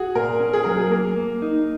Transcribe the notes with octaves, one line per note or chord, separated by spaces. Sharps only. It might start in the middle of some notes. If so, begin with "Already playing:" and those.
Already playing: F#4 G#4
A#2 A#4
C#4
G#4
F#3 A#4
G#4
A#3 A#4
A#3
D#4